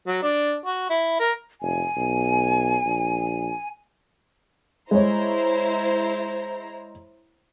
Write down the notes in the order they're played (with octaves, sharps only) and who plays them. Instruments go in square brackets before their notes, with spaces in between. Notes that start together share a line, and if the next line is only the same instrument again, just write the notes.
[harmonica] F#3
D4
F#4
E4
A#4
[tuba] F1 [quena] G#5
[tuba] B1
A#1
[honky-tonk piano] G#3 C#5 [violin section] E4 C5 A#5